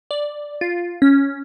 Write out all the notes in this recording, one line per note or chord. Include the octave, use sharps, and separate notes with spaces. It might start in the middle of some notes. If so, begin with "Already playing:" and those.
D5
F4
C#4